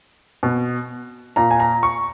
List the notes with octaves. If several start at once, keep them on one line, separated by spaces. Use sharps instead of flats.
B2
A#2 A#5
G#5
A#5
C#6